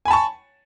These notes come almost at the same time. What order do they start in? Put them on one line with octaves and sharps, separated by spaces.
G#5 B5 A5 C#6